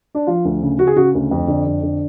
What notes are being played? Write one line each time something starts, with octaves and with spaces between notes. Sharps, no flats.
D4
F3 F4
D2
C#3
C#3 F#4
G#4
C#3 F#4
D2
F2
D3
F2
D3